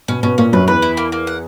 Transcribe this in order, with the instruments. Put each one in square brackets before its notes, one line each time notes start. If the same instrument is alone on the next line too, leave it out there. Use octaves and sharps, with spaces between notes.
[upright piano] B2 B3 [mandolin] C#4
[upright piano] B2 B3 [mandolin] C#4
[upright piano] A#2 A#3 [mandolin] C#4
[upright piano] F#2 F#3 [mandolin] B4
[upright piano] E2 E3 [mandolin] B4
[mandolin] E4
A#3
A#3
F#5